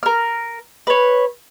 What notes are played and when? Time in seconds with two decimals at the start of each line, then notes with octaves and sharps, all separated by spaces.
0.03 A#4 F6
0.87 B4 C#5